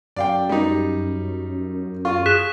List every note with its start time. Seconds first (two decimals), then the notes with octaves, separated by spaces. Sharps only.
0.16 F#2 D5 F5 G5
0.49 G3 D#4
2.05 F4 C#6
2.26 G#4 F#6 B6 E7